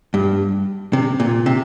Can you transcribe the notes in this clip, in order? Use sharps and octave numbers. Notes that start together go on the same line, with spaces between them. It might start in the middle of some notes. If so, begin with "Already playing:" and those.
G2
C3
A#2
C3